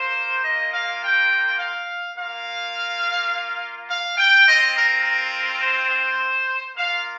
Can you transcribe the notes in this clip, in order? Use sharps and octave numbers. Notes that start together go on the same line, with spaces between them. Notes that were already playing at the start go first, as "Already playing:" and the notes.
Already playing: A#3 F4 C5
D#5
F5
G5
F5
A#3 F4 F5
F5
G5
C4 F4 D#5
A#4
A#4
C5
A#3 F4 F5